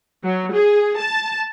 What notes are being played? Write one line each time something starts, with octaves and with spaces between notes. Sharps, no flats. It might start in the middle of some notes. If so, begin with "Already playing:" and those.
F#3
G#4
A5